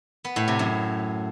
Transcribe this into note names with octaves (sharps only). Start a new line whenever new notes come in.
B3
A2
C3
F#2